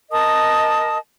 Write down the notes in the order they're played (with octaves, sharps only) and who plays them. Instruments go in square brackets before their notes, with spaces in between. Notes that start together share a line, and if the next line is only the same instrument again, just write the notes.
[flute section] A#4 D#5 A5 D#6